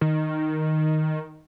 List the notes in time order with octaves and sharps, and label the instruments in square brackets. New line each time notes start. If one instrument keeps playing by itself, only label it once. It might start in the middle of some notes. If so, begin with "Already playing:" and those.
[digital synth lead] D#3